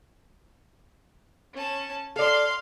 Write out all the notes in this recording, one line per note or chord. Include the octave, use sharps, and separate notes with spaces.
C#4 A5
A4 D5 F5 C6